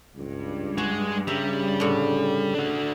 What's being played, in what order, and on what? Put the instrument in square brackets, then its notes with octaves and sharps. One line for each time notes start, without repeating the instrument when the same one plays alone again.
[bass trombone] C#2 [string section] G2
[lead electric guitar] G#3 [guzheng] F#4
[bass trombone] C#3 [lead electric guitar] G3 [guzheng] E5 A#5
[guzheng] A2 D3
[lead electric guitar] D4 F#4